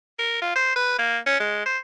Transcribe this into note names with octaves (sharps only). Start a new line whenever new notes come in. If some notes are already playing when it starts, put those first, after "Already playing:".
A#4
F4
C5
B4
A#3
C#4
G#3
C5